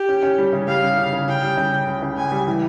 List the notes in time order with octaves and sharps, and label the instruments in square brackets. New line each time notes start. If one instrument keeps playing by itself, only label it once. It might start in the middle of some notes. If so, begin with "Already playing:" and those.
Already playing: [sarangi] G4
[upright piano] C#4
C#4
G3
C#3
[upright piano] G3 [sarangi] F5
[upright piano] C#4
C#3
C#3
[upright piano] C#4 [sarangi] G5
[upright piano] G3
C#3
C#4
C#2
C#3
[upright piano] C#2 [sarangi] G#5
[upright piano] G3
E3